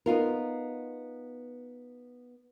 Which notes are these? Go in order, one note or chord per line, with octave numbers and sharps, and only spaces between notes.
B3 D#4 F4 A#4